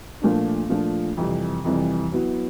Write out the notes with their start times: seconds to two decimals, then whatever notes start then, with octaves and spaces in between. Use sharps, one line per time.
0.22 A#2 F3 A3 D4
0.70 A#2 F3 A3 D4
1.17 F2 C3 E3 G3
1.65 F2 C3 E3 G3
2.12 F#3 B3 E4